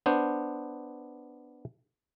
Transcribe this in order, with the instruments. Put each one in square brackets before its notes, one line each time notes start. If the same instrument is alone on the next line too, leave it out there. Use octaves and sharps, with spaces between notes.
[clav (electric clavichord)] B3 D4 C5